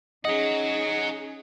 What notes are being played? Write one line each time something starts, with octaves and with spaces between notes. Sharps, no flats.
C#4 D#4 G#4 D#5 F#5 A#5